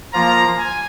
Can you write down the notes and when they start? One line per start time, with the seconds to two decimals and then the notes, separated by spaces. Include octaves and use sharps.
0.14 F3 A#3 F4 A#5
0.58 G#5